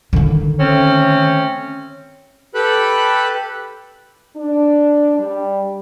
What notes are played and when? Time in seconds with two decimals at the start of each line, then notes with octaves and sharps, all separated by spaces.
0.13 D3 D#3
0.60 A3 C4 C#4
2.55 G4 A4 B4 B5 F#6
4.35 D4
5.17 G3